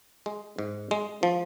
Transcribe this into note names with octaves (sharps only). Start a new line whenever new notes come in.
G#3
G#2
G#3
F3